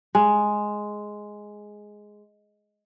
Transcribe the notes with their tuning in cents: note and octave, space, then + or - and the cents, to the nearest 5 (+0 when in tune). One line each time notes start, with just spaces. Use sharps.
G#3 +5